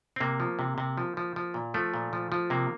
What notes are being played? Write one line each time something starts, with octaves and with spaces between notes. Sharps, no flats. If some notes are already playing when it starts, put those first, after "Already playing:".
C4
C3 A#3
F3
C3
C3
F3
F3
F3
A#2
F3 A3
A#2
F3
F3
C3 A#3